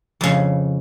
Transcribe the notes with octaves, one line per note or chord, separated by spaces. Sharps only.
F2 C#3